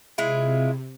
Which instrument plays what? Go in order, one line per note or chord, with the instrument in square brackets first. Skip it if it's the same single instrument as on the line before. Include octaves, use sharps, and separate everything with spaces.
[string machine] C3 [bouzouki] G#3 E4 F4